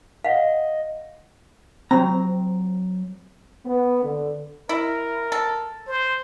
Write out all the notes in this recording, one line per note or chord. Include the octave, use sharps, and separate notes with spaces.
D#5 F5 F#5
F#3 C4 A#5
B3
D3
E4 A#4
A4
C5